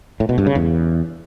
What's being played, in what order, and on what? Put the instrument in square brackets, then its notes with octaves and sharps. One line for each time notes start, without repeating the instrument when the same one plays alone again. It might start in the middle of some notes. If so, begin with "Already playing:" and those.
[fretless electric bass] A2
B2
G2
C#3
E2